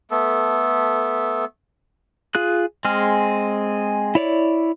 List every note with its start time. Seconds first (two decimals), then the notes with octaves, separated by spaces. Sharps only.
0.11 A3 B3 A4
2.35 F4 G#4 F#6
2.85 G#3 C4 G#4 F6
4.15 E4 C#5 D5